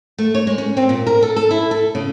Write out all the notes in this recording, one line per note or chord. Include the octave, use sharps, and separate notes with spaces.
A3
C#5
G#3
C#4
C4
A#2
A#4
A4
A4
E4
A4
C#3